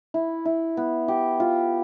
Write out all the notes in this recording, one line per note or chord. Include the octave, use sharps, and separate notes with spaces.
E4
E4
B3
G4
F4